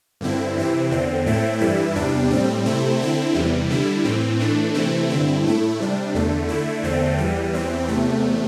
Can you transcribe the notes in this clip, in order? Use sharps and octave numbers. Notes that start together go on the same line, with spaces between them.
G2 D3 C4 E4
C3 E3 C4 E4
E2 D3 C4
A2 A3 C4 E4
G2 E3 G3 E4
E2 C3 G3 D4
A2 G3 C4
C3 A3 C4 E4
D3 C4 E4
E2 C3 E3 G3
D3 G3 E4
A2 E3 C4
A2 E3 A3 D4
C3 E3 A3 C4 E4
G2 D3 C4 E4
A2 A3 E4
C3 G3 D4
E2 D3 A3
D3 A3 E4
E2 D3 A3 C4
E2 E3 G3
E2 E3 C4
E2 C3 A3